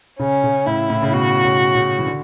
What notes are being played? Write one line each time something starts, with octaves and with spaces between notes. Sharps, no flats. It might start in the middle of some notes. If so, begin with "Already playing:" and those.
C#3 C#4
C#3
A2 E4
A2
C#3
B2 F#4
C#3
C#3
E3
D3